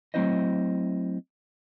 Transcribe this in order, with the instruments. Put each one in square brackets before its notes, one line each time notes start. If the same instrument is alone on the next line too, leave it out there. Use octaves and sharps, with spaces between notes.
[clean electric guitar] F#3 A3 C4 E4 C5 D#5